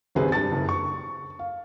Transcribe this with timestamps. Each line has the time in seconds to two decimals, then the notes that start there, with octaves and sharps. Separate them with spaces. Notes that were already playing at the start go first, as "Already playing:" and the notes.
0.15 G#1 C#2 C3 G#4 B4 C5
0.32 G2 A5 A6
0.52 F#1
0.69 C#6
1.39 F5